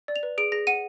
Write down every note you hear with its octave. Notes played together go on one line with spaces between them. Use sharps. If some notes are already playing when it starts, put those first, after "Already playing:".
D5
F7
B4
G#4 D7
G#4 A#6
F#5 D#7